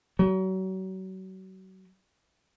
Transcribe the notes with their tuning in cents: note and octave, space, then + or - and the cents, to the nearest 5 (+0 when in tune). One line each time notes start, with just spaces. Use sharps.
F#3 +35